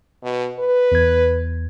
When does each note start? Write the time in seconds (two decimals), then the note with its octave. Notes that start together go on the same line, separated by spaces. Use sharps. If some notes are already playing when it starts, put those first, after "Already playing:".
0.23 B2
0.59 B4
0.92 E2 G#6